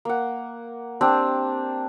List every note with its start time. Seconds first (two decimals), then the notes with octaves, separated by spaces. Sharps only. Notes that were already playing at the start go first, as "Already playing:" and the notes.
0.05 A#3 F#5
1.01 C4 D4 G4